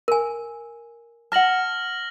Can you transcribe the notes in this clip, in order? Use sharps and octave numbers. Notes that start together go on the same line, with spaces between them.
A#4 G#5
F#5 A5 F6 A#6 F#7